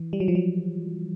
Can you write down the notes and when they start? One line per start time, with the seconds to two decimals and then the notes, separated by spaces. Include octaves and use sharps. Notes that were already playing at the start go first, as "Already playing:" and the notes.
Already playing: E3
0.13 G3
0.20 F#3
0.28 F3
0.35 F#3